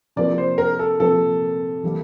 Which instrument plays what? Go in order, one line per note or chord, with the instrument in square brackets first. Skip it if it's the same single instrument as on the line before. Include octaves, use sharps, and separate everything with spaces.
[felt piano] C3 F3 A#3 F4 A#4 [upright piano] D5
[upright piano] C5
A#4
A4
[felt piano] C3 F3 A#3 F4 A#4 [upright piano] A4
[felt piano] E3 G3 A#3